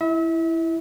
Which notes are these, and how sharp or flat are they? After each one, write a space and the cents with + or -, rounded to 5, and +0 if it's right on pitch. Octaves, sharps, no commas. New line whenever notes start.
E4 +0 E5 -35